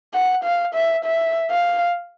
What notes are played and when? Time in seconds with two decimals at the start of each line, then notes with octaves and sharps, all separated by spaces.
0.14 F#5
0.44 F5
0.75 E5
1.05 E5
1.51 F5